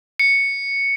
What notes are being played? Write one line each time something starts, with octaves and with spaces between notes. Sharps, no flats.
C#7